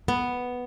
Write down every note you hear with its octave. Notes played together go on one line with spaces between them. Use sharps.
B3